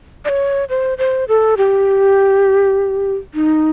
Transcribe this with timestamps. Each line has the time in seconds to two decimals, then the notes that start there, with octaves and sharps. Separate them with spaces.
0.25 D5
0.29 C#5
0.69 C5
0.98 C5
1.28 A4
1.57 G4
3.34 D#4